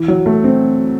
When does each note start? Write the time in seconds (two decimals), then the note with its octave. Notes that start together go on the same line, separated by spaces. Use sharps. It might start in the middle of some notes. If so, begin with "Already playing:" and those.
Already playing: E3
0.08 F#3
0.26 A3
0.44 C4